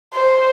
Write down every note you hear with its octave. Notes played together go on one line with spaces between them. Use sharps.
C5